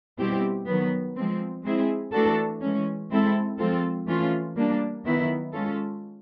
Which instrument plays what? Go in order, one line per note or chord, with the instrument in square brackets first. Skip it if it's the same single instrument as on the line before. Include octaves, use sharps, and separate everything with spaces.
[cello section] B2 G3 C4 E4 G4
D#3 F#3 B3
F3 G#3 C4
G#3 C4 E4 G#4
E3 A3 D4 F#4 A4
E3 G#3 C#4
G#3 C4 E4 A4
F3 G#3 C4 F4 A4
E3 A3 C#4 F4
G3 A#3 D4
D#3 F#3 B3 E4
G#3 C#4 F4 A4